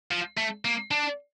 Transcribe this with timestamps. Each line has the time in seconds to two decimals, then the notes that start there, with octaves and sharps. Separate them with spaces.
0.11 F3
0.38 A3
0.65 A#3
0.91 D4